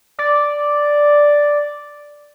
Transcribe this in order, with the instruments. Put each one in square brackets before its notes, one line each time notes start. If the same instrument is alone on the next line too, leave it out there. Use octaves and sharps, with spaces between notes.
[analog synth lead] D5